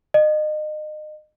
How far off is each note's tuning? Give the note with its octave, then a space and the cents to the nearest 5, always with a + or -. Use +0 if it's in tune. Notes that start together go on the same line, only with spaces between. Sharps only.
D#5 -30